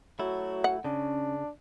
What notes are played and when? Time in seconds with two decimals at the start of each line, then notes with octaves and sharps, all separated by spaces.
0.19 F#3 A3 E4 F#4
0.64 F#5
0.84 C#3 C#4 D4